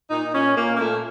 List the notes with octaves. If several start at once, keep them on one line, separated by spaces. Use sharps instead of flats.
A#2 D#4
A#2 C#4
A#2 A#3
A#3
A#2 A3